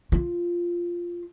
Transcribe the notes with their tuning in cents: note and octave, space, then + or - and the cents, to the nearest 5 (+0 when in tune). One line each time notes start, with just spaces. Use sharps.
F4 -5